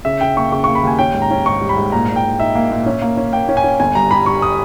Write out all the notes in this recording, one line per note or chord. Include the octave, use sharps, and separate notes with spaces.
C#3 E5
C#3 G5
A#3 C#6
C#3 C#6
A#3 C#6
B5
D#2 G#5
C#4 G5
G#2
A#5
C#4
G#2 C#6
G3
B5
G#2
A#2 A#5
A#2
G5
A#2
D#4 E5
A#3
A#2
C#4
A#3
C#4
A#3 G5
C#4
G#5
C#4
G1 G#5
G2 A#5
G3 B5
G3 C#6
D#6